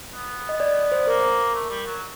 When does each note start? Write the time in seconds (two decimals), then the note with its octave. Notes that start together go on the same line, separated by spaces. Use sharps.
0.13 B3
0.49 D#5
0.60 D5
0.75 D5
0.92 C5
1.07 A#3 A#4
1.55 A3
1.70 G3
1.86 F#3